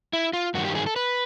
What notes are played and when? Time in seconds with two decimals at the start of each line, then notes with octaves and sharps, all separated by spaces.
0.13 E4
0.33 F4
0.54 G2 D#3 F#3 F#4
0.65 G4
0.75 G#4
0.86 A4
0.96 B4